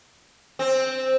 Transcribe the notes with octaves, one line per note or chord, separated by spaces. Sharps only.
C4